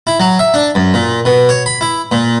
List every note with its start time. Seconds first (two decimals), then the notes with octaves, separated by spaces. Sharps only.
0.07 E4
0.20 F#3
0.39 E5
0.54 D4
0.75 F#2
0.94 A#2
1.25 B2
1.49 C#5
1.66 B5
1.81 E4
2.12 A#2